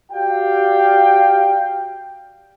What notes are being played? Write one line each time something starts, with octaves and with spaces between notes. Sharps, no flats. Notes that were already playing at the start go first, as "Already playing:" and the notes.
F#4 G4 D5 F5 G5